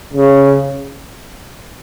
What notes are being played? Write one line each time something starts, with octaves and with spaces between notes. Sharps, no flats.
C#3